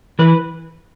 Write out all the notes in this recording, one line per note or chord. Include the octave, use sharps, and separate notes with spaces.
E3 B4